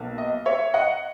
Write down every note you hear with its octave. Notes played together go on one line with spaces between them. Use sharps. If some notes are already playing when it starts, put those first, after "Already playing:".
Already playing: B1 B2 A#3
D#5
C#5 E5
D#5 F#5